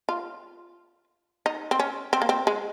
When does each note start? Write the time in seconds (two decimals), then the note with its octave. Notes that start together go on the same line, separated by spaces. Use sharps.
0.09 F4
1.46 D#4
1.71 C4
1.80 C#4
2.13 C4
2.22 A#3
2.29 C4
2.47 G#3